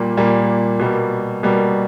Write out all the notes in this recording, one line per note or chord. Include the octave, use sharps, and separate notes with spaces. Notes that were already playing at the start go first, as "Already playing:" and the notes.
Already playing: A#2 G3 A#3
A#2 G3 A#3
B2 G3 A#3
B2 G3 A#3